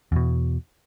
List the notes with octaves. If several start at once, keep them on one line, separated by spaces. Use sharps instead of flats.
E2 B2